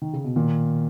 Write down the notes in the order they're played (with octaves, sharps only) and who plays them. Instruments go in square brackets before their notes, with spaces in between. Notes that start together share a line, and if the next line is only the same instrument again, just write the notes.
[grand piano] D#3
C#3
B2
[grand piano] A#2 [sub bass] D#3